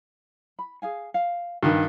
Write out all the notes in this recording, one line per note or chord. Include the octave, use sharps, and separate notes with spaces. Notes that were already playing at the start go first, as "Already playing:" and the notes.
B5
G#4 F5 G#5
F5
G2 D#3 F#4 B4